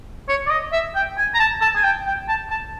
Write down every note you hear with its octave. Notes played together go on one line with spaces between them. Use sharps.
C#5
D5
D#5
E5
G5
G#5
A#5
A5
A5
G#5
G5
G5
A5
A5